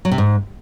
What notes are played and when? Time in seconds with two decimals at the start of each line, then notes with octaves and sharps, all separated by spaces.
0.05 F#3
0.11 C3
0.18 G#2